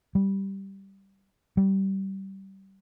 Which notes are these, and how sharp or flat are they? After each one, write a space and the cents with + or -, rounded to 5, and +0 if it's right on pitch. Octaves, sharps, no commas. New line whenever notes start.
G3 -5
G3 -20